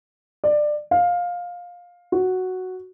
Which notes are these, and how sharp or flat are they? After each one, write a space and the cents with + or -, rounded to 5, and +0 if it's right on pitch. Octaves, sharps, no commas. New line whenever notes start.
D5 +20
F5 +15
F#4 +0